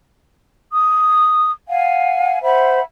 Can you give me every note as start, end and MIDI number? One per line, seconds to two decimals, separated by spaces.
0.72 1.49 87
1.67 2.41 77
1.67 2.41 78
1.67 2.41 80
2.42 2.81 72
2.42 2.81 76
2.42 2.81 78
2.42 2.81 83